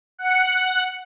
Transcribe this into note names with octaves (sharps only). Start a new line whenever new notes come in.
F#5